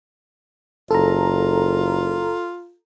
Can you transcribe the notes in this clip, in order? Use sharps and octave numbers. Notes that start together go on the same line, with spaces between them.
F#1 F4 A4 A#5